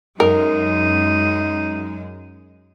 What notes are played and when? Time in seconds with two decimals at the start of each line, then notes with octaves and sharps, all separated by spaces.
0.20 F#2 G#3 D#4 A#4